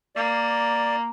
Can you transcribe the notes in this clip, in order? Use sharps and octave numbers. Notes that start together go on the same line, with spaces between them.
A#3 D5